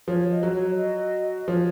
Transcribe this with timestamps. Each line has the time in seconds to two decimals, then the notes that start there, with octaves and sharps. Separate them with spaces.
0.08 F3 C#5
0.32 D#5
0.43 F#3
0.54 C#5
0.78 D#5
1.47 F3 C#5